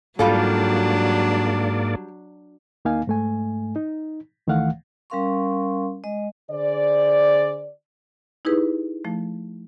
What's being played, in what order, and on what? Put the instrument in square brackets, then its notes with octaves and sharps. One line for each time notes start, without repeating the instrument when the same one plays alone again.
[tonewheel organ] G#2 A#3 D5 [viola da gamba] F#3 D4 [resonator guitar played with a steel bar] G3 F4 A4
[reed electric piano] D2 A#3 D#4 F5 G#5
G#2 A3 G#5
D#4
C#2 D#3 E3 A3 F5 F#5
[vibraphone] G3 C#4 A#4 F5 C6 C#6
G#3 D#5
[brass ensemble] D3 G#4 C5 D5
[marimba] D#4 E4 G4 G#4 B4
F3 A3